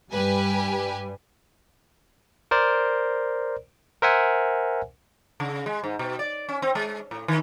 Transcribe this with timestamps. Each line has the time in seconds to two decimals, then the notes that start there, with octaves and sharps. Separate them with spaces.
0.11 G2 G3 G4 B4 G#5
2.51 A#4 C5 D5
4.02 A#4 C5 E5 F#5 G#5
5.40 C#3
5.66 G#3
5.84 G#2
5.99 B2
6.19 D5
6.49 C#4
6.62 C4
6.75 G#3
7.11 A2
7.28 D#3